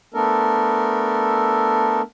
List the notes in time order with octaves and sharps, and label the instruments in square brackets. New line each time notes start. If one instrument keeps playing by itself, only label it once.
[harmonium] A3 B3 D4 A4 A#4